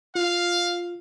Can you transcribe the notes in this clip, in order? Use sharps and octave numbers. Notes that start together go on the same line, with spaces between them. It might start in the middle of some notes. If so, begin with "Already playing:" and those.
F4 F5